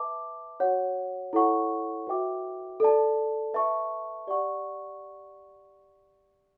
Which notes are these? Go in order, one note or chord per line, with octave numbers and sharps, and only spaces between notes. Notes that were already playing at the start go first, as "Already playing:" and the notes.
Already playing: B4 E5 A5 D6
F#4 C#5 F#5
E4 A4 C#5 F#5 C#6
F#4 B4 E5 G5 D6
A4 D5 A5
B4 E5 A5 C#6
G4 D5 F#5 C#6